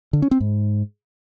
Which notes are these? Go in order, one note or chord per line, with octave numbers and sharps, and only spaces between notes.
D3
C#4
C4
G#2